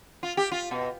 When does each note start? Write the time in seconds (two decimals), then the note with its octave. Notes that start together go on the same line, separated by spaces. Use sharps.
0.23 F4
0.37 G4
0.52 F4
0.71 B2